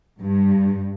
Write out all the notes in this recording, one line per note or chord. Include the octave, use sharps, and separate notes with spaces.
G2